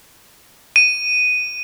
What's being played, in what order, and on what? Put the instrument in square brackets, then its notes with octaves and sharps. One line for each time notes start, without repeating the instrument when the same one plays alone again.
[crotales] D#7